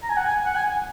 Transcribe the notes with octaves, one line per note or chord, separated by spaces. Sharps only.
A#5
G#5
F#5
G#5
F#5
G#5